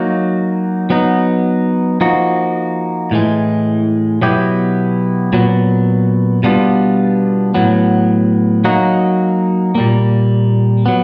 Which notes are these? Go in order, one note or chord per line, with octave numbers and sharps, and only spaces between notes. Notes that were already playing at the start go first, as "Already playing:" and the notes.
Already playing: F#3 A#3 D#4 F#4
F#3 B3 D#4
F3 A#3 D#4 F#4
A2 E3 G#3
B2 F#3 B3 E4 G4
A#2 F#3 B3
B2 G3 B3 D4 F4
A2 F#3 B3
F#3 A#3 D#4 F#4
A#2 G3 A#3
F#3 B3